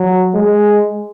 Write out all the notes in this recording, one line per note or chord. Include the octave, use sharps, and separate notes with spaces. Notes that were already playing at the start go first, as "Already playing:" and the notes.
Already playing: F#3
G#3